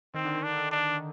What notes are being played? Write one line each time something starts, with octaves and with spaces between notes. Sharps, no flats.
D#3 C4
D3
D#3
D4
D3
D4